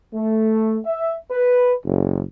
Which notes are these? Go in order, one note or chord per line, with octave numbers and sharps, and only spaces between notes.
A3
E5
B4
F#1